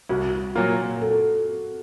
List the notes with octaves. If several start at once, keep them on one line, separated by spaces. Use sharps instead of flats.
C2 F#4
A#2 F#3 A#3 F4
A4